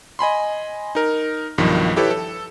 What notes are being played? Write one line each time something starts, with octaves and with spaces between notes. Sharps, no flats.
D#5 G#5 B5 C6
D#4 A#4
B1 G2 D#3 F3
E4 G4 A4 B4 C#5
A4